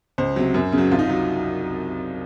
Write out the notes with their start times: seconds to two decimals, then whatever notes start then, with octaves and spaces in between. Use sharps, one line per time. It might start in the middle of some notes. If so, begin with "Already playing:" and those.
0.18 C#2 C5
0.36 C3 F#3
0.54 F#2
0.72 C#3
0.78 F#3
0.91 C2 F4
0.99 D#4
1.06 F#3 F4